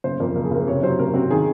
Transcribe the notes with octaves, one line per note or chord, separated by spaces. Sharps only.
F#1 C5
F2 A#4
F#1 A#4
G#4
F#1 A#4
C3 C#5
F#3 C5
C3 A#4
C4 F#4
D#3 G#4